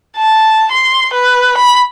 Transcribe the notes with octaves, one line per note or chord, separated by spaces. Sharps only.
A5
C6
B4
B5